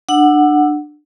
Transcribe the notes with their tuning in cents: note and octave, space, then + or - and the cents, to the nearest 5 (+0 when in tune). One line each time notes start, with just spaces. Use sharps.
D4 +25 F#5 +0 E6 +0